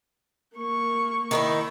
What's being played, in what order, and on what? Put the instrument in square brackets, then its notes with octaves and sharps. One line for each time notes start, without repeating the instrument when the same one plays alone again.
[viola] A#3 C#6
[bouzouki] D#3 D#4 E4